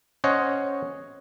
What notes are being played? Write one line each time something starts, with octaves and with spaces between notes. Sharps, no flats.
C#4 C5 C#5 D#5 F#5